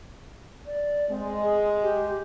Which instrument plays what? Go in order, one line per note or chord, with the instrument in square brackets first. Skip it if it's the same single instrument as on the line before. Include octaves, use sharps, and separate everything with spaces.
[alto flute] D5
[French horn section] G#3 [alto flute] C4
[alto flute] G#4
G4